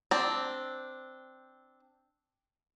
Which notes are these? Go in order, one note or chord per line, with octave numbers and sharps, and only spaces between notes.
C4 D4